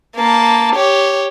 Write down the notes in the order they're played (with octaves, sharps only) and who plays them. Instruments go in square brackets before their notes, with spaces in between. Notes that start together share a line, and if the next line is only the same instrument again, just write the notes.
[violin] A#3 A5
G4 C#5